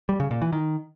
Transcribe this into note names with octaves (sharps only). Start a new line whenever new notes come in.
G3
C#3
A#2
E3
D#3